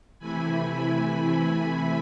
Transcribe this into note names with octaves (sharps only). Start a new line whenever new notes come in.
C3 E3 A3 E4 G#5 B5